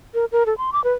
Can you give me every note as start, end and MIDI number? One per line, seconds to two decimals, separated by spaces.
0.14 0.25 70
0.32 0.46 70
0.46 0.57 69
0.58 0.70 84
0.73 0.83 86
0.84 0.93 71